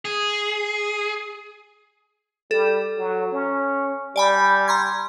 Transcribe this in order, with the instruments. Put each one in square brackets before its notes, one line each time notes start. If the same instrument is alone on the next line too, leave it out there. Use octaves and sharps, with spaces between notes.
[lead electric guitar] G#4
[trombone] G3 [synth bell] A4
[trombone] F#3
C#4
[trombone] G3 [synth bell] D5 G#5 B5
[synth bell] A#5 C6 G#6